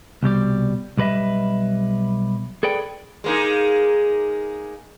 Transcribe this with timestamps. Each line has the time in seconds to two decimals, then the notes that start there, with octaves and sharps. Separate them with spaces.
0.23 C2 B2 G3 D5
0.97 B1 G3 B4 D#5 E5
2.63 G#4 A4 B4 D5 G5
3.24 G#3 A#3 D#4